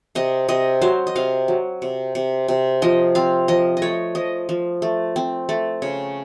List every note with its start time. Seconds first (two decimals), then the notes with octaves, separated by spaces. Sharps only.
0.15 C3 D#5
0.48 C3 D#5
0.81 F#3 C5
1.07 D#5
1.16 C3 F5
1.48 F#3
1.82 C3
2.15 C3
2.48 C3
2.82 F3 D#5
3.15 C4 F5
3.48 F3 D#5
3.77 D#5
3.82 A3 C#5
4.15 F3 D#5
4.49 F3
4.82 A3
5.16 C4
5.49 A3
5.82 C#3